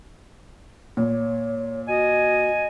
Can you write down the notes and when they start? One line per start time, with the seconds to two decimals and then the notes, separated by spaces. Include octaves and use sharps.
0.97 A#2 C#5
1.88 F#4 D#5 G#5